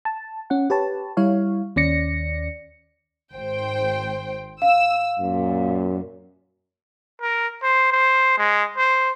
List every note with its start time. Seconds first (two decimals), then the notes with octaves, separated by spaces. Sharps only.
0.05 A5
0.50 C#4 F#5
0.70 G4 B4 C#5 A5
1.17 G3 E4 C#5 F5
1.76 D#2 C#4 D5 A#6 C#7
3.33 G#1 C5 G5
4.62 F5 E6
5.19 F#2 A#2
7.22 A#4
7.62 C5
7.92 C5
8.38 G#3
8.77 C5